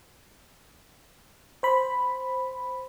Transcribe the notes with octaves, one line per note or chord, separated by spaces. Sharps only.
C5 B5